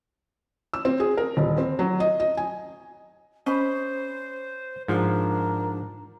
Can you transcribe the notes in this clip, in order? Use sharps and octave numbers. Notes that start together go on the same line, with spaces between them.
E6
C4
G#4
A#4
D#1
C4
F#3
D#5
D#5
G#5
C#4 C5 D#5 B5
G#2 F3 D4 A#4